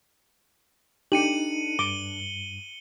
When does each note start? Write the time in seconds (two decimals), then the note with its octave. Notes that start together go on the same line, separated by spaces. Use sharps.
1.12 D4 D#4 G4 A4 C#7 D#7 F#7
1.79 G2 D6 G7